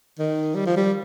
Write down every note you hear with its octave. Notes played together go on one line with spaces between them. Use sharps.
D#3
G3
F3
G3